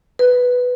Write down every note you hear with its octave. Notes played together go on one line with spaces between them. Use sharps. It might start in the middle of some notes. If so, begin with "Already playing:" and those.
B4